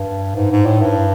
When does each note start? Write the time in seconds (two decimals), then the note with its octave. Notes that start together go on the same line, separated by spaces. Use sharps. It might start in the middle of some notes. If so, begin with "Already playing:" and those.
Already playing: G2
0.36 G#2
0.52 G#2
0.66 A2
0.81 G2